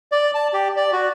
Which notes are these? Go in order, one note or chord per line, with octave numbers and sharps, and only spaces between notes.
D5
A5
G4
D5
F#4